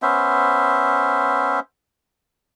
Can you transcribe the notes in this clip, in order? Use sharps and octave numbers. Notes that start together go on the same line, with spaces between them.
B3 C#4 C5 E5